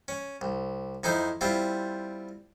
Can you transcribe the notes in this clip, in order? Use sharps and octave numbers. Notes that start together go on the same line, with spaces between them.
C#4
C2
F2 D#4 E4 C5
G3 C4 E4 F4